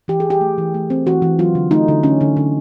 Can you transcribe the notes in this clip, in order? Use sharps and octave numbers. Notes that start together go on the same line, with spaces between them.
E3 G4
G#4
E3
G4
A3
E3
A3
C4
E3 F#4
E3
F#3 F4
D3
A3 D#4
D3
D3 C#4
D3
D3